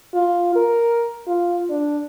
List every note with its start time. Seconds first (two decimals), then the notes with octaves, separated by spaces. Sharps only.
0.14 F4
0.55 A#4
1.27 F4
1.70 D4